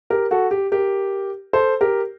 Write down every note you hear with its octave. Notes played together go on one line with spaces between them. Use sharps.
G4 A#4
F#4 A4
G4
G4 A#4
A4 C5
G4 A#4